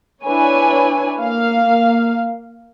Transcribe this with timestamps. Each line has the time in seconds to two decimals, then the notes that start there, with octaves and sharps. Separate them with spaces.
0.24 D4 E4 B4 C#5 G#5
1.20 A#3 F5